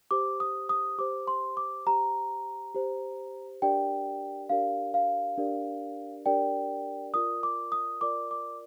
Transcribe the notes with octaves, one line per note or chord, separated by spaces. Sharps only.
G4 C5 D6
D#6
D#6
G4 C5 D6
C6
D6
G4 C5 A#5
G4 C5
D4 G4 A#4 D5 G5
D4 G4 A#4 D5 F5
F5
D4 G4 A#4 D5
D4 G4 A#4 D5 G5
F4 A#4 D5 D#6
D6
D#6
F4 A#4 D5 D6
D6